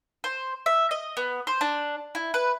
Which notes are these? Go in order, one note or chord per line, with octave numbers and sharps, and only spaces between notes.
C5
E5
D#5
B3
C5
D4
E4
B4